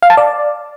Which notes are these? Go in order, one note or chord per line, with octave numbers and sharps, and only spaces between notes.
F5
A5
D5